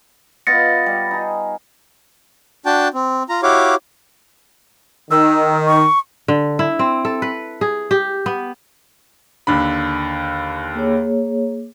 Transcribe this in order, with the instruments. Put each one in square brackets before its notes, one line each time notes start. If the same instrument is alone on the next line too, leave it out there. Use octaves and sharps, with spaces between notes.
[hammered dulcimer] B3 F4 D#5 [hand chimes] A6 A#6 C#7
[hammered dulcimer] G3
D#4 G#4
[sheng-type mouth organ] D4 F#4 G5 A5
C4
F4 A#5
E4 F#4 G4 C#5 F5 D6
[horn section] D#3 [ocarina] E6
[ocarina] C#6
[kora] D3
E4
C4
A4
B4
G#4
G4
B3
[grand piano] D#2 D3 B5
[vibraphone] A#3 G#4 C#5